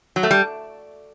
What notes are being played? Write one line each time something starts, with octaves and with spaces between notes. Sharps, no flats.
F#3
A3
G3